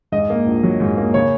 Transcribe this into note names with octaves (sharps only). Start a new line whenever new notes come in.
G#2 D#5
A#3
A#1
F#3
G#2
A#3
C#3 C#5